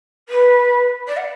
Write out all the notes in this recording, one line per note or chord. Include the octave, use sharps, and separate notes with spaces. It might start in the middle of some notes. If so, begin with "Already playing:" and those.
B4
D5
F#5